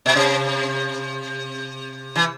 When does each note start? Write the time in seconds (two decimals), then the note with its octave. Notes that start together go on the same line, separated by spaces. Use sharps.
0.06 B2
0.16 C3
2.16 E3